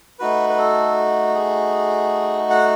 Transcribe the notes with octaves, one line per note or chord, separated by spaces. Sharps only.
A3 D#4 F#4 B4
B4
A4
G#4
F#5